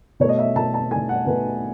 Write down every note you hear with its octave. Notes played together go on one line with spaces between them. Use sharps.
B2 A3 C#5
D#5
E5
B2 A3 A5
A5
B2 A3 G#5
F#5
B2 A3 B4